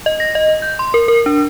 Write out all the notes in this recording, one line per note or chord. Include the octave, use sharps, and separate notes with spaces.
D#5
A#6
D#5
G6
C6
A#4
A#4
D4